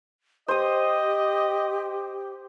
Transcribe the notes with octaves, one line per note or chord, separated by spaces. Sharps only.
G4 C5 D#5 D#6